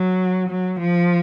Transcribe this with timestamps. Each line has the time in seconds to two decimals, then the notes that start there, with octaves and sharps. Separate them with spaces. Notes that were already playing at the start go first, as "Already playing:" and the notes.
Already playing: F#3
0.49 F#3
0.80 F3